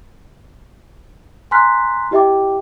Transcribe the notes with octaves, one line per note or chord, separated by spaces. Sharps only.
G#5 A#5 C6 F6 F#6 B6
E4 G4 D#5 E5 G5 D6